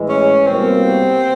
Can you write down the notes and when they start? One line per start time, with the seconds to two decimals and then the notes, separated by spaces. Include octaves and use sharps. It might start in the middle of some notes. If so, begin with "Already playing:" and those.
Already playing: A2 E3 G#3
0.09 C#4
0.47 C2 B2 G3 A#3 C4